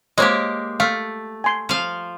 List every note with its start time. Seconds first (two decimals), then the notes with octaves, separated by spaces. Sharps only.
0.18 G#3 A#3 G4 C5 C#5 D#5
0.80 A3 F5
1.44 G#5 C6
1.69 F3 F5